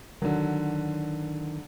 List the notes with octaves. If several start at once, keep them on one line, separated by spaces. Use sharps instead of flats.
D3 D#3 F#3